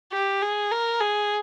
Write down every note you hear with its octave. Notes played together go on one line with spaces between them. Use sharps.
G4
G#4
A#4
G#4